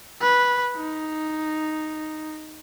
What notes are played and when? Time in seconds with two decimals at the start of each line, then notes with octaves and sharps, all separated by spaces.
0.21 B4
0.76 D#4